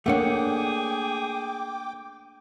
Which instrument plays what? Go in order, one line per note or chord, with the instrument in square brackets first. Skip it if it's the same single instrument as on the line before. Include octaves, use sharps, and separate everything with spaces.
[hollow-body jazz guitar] A3 A#3 C#5 [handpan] D4 F#5 [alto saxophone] G#4 [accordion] G5 D6